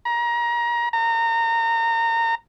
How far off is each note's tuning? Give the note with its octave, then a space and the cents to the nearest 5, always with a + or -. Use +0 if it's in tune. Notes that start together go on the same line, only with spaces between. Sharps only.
A#5 +25
A#5 -30